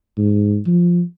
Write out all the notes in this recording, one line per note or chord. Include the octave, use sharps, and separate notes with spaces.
G#2
F3